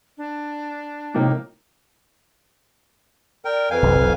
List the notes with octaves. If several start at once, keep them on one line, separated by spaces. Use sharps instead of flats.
D4
A2 C3 F3 A#3 D#4 G4
A#4 D5 G5
F2 B4 F5 G#5
F#1 B1 C3
E1 B1